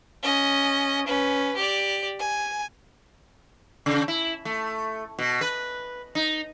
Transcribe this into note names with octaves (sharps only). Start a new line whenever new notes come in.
C#4 D#5
C#4 B4
G4 D5
G#5
C#3
E4
A3
B2
B4
D#4